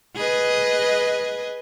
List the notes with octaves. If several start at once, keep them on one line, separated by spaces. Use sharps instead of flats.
G#4 B4 D#5